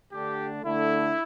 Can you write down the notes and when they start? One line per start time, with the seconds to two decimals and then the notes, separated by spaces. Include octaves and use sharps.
0.13 D3 A3 D4 G4
0.64 D3 A3 D4 E4